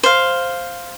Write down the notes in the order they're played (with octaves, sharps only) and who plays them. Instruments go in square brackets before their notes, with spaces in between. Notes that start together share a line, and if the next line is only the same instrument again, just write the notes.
[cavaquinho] C5 F5